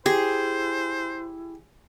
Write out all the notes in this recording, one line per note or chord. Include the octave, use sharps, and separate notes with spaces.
E4 G4 G#4 C5